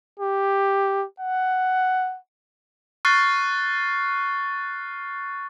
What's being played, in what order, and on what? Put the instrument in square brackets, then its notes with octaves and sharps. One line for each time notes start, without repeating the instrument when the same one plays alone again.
[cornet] G4
F#5
[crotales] C#6 F6 F#6 A6 C7